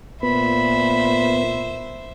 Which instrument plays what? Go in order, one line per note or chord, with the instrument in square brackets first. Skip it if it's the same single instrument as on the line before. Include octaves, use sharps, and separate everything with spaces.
[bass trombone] A#2 [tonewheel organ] B3 [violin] C5 E5 [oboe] B5